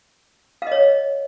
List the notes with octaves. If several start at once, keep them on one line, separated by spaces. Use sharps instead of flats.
C#5 D#5 F5